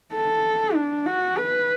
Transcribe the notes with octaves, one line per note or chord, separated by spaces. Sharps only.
A4
D4
F#4
B4